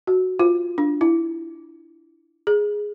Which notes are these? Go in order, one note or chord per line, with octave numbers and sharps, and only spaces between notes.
F#4
F4
D4
E4
G#4